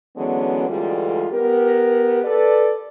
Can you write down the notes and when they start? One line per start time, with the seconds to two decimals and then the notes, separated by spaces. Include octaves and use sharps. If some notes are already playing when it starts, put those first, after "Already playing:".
0.17 D3 E3 F#3 G#3 B3 C#4
0.68 D2 E3 G3 G#3 F4 A4
1.32 B3 G4 A#4
2.24 A4 B4 D5